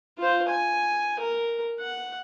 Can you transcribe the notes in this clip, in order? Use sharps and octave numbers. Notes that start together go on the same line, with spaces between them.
F4 C5
G#5
A#4
F#5